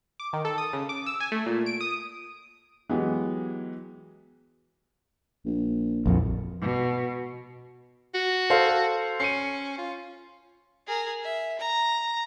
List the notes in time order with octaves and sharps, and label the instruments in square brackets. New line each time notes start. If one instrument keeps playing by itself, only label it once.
[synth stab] D6
D#3
A4
D#6
C#3
D6
E6
G#5
A3
A#2
D7
D#6
[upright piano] E3 F#3 G#3 B3 G4
[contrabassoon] A#1
[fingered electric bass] A#1 F2
[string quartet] B2
[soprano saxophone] F#4
[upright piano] A4 C5 F5
[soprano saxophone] C#4 [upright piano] C7 C#7 D#7
[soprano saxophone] F4
[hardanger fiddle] G#4 A#4
E5
A#5